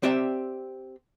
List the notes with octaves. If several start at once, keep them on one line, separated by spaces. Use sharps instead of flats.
C4 G4 D5 E5